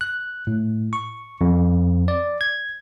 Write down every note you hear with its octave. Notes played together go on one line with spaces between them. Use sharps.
F#6
A2
C#6
F2
D5
G#6